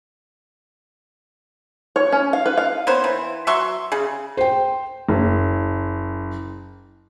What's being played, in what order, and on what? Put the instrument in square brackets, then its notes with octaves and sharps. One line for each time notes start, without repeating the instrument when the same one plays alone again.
[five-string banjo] C#5
C#4
F5
B4
F5
[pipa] A#3 B3 C5 C#5
E3
F#3 E5 C6 C#6
C#3 G#4
[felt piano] C5 G5
F#1